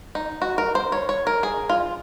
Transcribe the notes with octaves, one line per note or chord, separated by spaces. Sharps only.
D#4
F#4
A#4
C5
C#5
C#5
A#4
G#4
F4